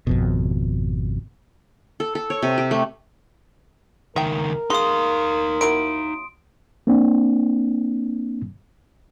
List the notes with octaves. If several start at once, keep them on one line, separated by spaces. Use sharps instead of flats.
G#1 F2 B2
A4
A4
C#5
C3
G4
A3
C#2 D#3 A#4 E5 G5
G#3 D#4 F5 C6 D#6
F#3 A#3 E4 D7
A#3 C4 D4